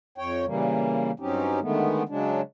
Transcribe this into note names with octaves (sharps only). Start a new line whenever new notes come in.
F2 C#5 G5
A#2 C#3 E3 G3 A#3
G2 F#3 C4 C#4 D#4 G4
D3 D#3 G#3 A3 B3
C#3 F#3 G#3 D4